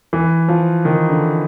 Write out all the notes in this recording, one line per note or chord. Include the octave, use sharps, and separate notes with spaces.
E3
F3
D#3
D3